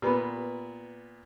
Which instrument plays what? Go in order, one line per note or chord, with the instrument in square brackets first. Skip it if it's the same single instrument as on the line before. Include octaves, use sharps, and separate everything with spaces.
[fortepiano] A#2 B3 [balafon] G4 B4 B5